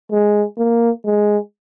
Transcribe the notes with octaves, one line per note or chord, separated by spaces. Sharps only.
G#3
A#3
G#3